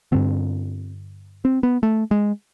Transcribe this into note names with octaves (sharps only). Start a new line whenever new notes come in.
G2 D3 C4
C4
B3
A3
G#3